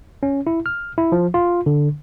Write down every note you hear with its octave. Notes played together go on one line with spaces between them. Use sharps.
C#4
E4
F6
E4
F3
F4
D3